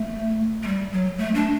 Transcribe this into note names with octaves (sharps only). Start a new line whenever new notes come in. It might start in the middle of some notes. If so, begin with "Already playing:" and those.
Already playing: A3
A3
G3
F#3
A3
D4